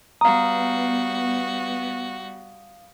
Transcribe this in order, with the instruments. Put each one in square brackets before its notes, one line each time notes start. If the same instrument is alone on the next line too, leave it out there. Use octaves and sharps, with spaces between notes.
[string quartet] G3 F#4 [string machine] B3 [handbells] F5 D#6 [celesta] A#5